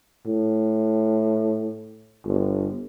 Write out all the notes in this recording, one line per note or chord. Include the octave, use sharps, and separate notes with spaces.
A2
G1